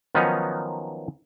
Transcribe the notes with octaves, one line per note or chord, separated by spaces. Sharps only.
D#3 F3 F#3 B3 C#4 D#4